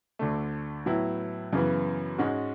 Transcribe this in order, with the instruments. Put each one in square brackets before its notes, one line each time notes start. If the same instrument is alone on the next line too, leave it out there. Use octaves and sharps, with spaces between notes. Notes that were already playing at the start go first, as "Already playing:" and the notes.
[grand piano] D2 D3 A3
A2 F#3 B3 E4
F#2 C#3 E3 B3
G#2 G#3 C#4 F#4